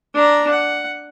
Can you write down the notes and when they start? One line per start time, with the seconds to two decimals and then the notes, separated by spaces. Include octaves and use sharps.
0.15 D4 A#5
0.50 F#5